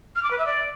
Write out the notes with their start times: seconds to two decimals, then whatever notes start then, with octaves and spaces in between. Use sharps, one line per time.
0.16 F6
0.23 D6
0.31 B4
0.38 E5
0.46 D5